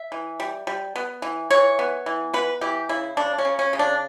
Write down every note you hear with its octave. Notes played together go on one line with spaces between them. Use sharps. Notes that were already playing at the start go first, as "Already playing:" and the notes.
Already playing: E5
E3
G3
G3
B3
E3
E3 C#5
B3
E3
B3 B4
E3 G4
C#3 E4
C#3 D4
C#4
C#3
C#4
C#3
D4